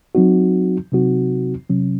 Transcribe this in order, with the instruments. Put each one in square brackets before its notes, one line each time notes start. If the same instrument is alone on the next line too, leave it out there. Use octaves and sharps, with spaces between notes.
[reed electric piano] F#3 C4 D#4 F#4
C3 F#3 C4 D#4 F#4
C3 F#3 C#4